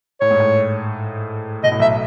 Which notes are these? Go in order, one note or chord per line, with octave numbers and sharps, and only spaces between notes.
A2 C#5
G#2
A2
B2 D#5
A2
B1 B2 E5